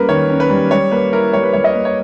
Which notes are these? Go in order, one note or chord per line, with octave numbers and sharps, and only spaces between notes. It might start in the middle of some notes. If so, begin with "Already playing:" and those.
Already playing: G3 A#3 C#4 A#4 B4
D#3 C#5
C#4
B4
G3
G3 C#5
A#3 B4
E4 A#4
G3 C#5
B4
G3 C#5
D#5
A#3
C#5